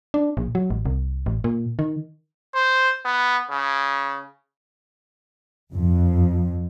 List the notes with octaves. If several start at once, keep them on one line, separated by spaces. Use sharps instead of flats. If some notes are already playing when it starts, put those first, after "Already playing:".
D4
A#1
F#3
A1
C2
A1
A#2
D#3
C5
B3
C#3
F2